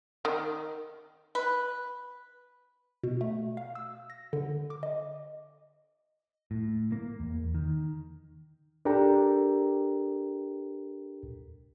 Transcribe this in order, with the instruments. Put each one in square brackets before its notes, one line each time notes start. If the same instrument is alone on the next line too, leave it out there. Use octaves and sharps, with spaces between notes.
[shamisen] D#3
[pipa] B4
[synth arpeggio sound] B2
A3
F5
E6
A#6
D3
D6
D#5
[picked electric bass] A2
A#3
E2
D#3
[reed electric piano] D4 G4 A4 A#4 G5 A#5